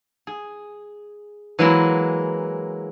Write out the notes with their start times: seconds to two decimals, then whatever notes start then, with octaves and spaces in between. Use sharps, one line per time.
0.27 G#4
1.59 E3 F#3 G#3 A#3 E4 C6